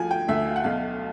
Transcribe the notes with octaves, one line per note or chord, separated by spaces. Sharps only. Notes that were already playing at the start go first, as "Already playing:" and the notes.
Already playing: D2 F3 G#5
G5
D2 E5
F5
F#5
B1 F5